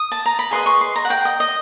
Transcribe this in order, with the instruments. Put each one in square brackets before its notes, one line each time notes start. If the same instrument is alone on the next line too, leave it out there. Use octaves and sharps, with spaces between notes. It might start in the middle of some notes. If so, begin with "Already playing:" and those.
Already playing: [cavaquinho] D#6
A5
A#5
B5
G#4 B4 D#5 C6
C#6
C6
A#5
F#5
G5
D#5
D#5